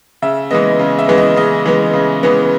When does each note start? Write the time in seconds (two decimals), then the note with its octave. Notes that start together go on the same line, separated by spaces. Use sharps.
0.22 C#3 E5
0.51 E3 G#3 B3 D#5
0.79 C#3
0.99 E5
1.08 E3 G#3 B3
1.18 D#5
1.36 C#3 D#5
1.66 E3 G#3 B3
1.94 C#3
2.23 E3 G#3 B3